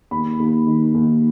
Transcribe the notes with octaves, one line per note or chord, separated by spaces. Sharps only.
D#2 B5
D#2
D#3
D#2